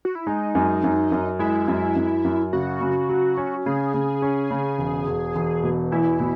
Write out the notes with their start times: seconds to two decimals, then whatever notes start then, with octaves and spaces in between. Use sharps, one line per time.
0.05 F#4
0.15 E4
0.27 G#3 D#4
0.55 F#2
0.84 F#2
1.12 F#2
1.39 G#3 E4
1.68 F#2
1.96 F#2
2.25 F#2
2.53 C#3 F#4
2.81 C#3
3.09 F#3
3.37 C#4
3.66 C#3 G#4
3.94 C#3
4.22 C#4
4.51 C#3
4.78 E1
5.07 E1
5.36 E1
5.63 B2
5.92 E2 E4
6.20 B2